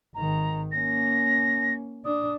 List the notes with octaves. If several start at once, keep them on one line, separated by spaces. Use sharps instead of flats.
G#1 D#3 A#5
A#3 C#4 A#6
D4 D#6